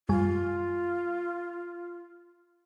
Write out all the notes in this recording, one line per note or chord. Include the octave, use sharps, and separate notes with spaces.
F#2 G3 F4 G#5